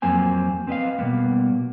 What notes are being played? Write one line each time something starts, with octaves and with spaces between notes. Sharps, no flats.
F2 F#3 A#3 C4 G#5
C4 B4 D#5 F5
B2 G3 A#3 B3